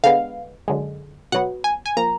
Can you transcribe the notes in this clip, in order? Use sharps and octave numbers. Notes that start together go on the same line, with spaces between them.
D3 G#3 B3 F5
F#2 D3 G#3
B2 F#3 B3 F#5
G#5
G#5
F3 A#3 A#5